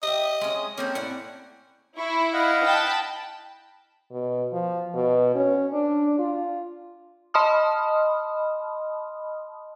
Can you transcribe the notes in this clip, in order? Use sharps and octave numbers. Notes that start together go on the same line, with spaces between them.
G4 D#5 E5
G#3 C#4
A#3 C4 C#4 A4
A2 D5 F#5
E4 B5 C#6
D#5 F5 F#5
G5 A5 B5
B2
F3
B2
C#4
D4
F4
D#5 A5 B5 C6 D#6 F6